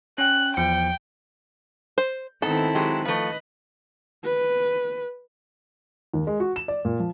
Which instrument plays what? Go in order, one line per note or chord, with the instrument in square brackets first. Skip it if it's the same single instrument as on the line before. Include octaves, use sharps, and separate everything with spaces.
[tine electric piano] C#4 G5 [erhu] F#6
[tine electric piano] E2 F3 C#7 [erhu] G5
[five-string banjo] C5
[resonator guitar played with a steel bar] G#2 B3 [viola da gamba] D#3 C4 E4 [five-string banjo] A4
[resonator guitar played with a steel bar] F#3 G#3 G4
[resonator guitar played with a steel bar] F3 A3 [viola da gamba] B4 D#5
[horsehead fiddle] B4
[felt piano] D#2
G#3
F#4
E7
D5
A#2
F3